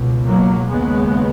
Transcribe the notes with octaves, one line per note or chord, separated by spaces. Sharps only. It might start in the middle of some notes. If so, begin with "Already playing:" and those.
Already playing: C#2 B2
F#3 A#3
D#2 C#3 G#3 B3